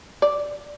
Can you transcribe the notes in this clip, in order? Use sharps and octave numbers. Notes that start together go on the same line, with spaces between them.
D5